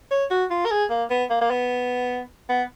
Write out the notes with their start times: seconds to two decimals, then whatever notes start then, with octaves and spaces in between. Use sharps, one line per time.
0.11 C#5
0.31 F#4
0.50 F4
0.65 A#4
0.71 G#4
0.90 A#3
1.10 B3
1.30 A#3
1.41 A#3
1.51 B3
2.49 B3